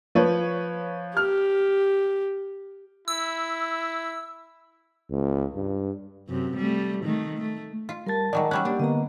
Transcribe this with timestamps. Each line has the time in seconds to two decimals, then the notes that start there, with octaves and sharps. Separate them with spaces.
0.15 F3 B4 C#5
1.17 G4 F6
3.08 E4 E6
5.10 C#2
5.56 G2
6.28 F#2 C3
6.57 G3 A3
7.04 D#3 A3
7.38 A3
7.89 F4
8.07 G3 A#4 A5 A6
8.33 D#3 F#3 G#3 D5 A#5
8.51 F#3 G3 C#4 C#5 B5 F#6
8.65 A#3 D4 G4 D5
8.80 D3 A#3 B3 D#5 A#5